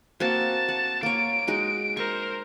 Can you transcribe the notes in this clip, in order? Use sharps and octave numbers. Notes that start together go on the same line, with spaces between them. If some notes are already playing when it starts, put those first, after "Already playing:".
A#3 C4 F#4 A5
F#5
A#3 C#5 D7
G#3 D#4 F#4
A#4 C5 C#6